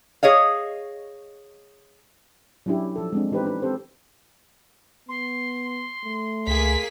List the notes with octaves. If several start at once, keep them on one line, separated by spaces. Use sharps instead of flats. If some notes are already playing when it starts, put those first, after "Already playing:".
G#4 C#5 D#5 F5
F#3 C#4 D4 E4 G4
F3 A4
G#3 C4 D4
E3 D#4 G4 B4 C5
C#4 D4 B4
C4 G4 A4 C5
B3 C6
A3
C#2 A#3 G#4 B6